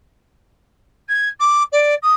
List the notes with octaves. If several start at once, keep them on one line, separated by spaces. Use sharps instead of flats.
G#6
D6
D5
D#6